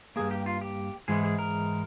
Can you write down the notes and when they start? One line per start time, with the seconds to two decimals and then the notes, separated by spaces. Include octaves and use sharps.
0.16 G2 E3 A#3 G#4
0.31 G4
0.46 F4
0.61 G4
1.08 G#2 E3 G#3 G#4
1.24 G#4
1.38 A#4